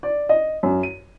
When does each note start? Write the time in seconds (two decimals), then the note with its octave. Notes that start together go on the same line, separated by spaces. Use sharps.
0.03 D5
0.29 D#5
0.63 F#2
0.83 D#7